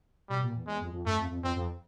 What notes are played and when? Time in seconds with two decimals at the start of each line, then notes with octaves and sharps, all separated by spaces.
0.29 B2 G3
0.42 A#2
0.55 E2
0.67 E2 G#3
0.80 F2
0.93 F2
1.05 F#2 A3
1.18 F2
1.31 F2
1.43 F2 C4
1.56 F2